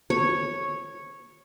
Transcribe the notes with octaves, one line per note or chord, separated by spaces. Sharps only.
C#5